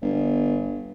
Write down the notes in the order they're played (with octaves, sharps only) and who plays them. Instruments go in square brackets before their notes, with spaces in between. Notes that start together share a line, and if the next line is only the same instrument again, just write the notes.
[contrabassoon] G1